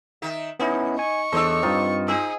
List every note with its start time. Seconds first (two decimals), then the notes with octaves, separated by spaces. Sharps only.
0.22 D#3 D#4 E5
0.60 B3 C#4 D#4 E4
0.99 G#5 C#6
1.32 E2 D4 A4 C5 C#5 D#5 E6
1.63 G2 C4 D#4 F4
2.08 D#4 G#4 E6